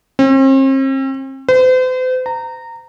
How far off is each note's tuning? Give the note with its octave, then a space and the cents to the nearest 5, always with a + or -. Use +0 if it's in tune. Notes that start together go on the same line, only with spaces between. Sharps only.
C4 +45
C5 -40
A#5 -20